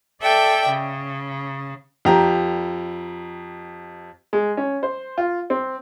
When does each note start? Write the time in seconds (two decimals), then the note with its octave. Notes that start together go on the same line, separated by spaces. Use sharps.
0.22 A4 D5 E5 G5
0.68 C#3
2.05 F2 G4 A#5
4.33 G#3
4.57 C#4
4.83 C5
5.18 F4
5.50 C4